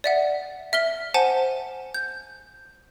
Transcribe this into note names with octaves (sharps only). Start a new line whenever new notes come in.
D5 E5 F#5
E5 F6 G7
C5 F#5 G#5 A5
G6